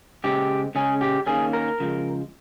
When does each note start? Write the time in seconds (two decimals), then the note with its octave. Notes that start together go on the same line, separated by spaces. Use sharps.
0.24 C#3 G#3 C4 G4
0.75 C#3 G#3 C#4 G#4
1.01 G4
1.26 D#3 A#3 C#4 G#4
1.53 A#4
1.80 C#3 F3 G#3